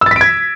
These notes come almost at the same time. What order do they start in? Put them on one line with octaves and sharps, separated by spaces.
E6 A6 B6 D7 G#6